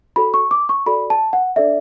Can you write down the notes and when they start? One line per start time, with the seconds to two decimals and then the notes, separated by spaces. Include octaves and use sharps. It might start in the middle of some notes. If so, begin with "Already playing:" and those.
0.16 F#4 A4 C#5 B5
0.34 C#6
0.51 D6
0.69 C#6
0.86 F#4 A4 D5 B5
1.10 A5
1.33 F#5
1.56 D4 A4 D5 E5